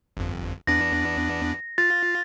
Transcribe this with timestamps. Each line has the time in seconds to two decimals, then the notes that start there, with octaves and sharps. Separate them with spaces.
0.17 G1 F2
0.67 E2 B3 D4 A#6
1.78 F4 A6